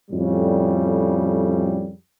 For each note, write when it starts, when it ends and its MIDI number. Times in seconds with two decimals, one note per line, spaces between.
0.11 1.91 41
0.11 1.91 45
0.11 1.91 49
0.11 1.91 55